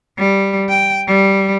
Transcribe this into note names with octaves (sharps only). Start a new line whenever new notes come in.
G3
G5
G3